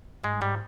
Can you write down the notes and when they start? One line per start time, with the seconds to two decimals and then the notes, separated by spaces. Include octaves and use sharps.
0.23 G#2 G#3
0.41 G#2 G3